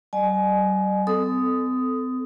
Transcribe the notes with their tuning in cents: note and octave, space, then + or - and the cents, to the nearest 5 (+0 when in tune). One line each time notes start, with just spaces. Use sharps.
G3 -45 D#5 -45 G#5 +25
C4 -40 A4 +0 D#6 +0